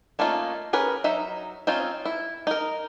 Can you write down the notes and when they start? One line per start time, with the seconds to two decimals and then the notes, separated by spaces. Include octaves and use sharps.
0.19 A3 A#3 C#4 D#4 F4
0.73 C#4 G#4 A#4 B4
1.04 F#3 D#4 E5
1.67 C4 C#4 D#4 F4
2.05 E4
2.47 D#4 A#4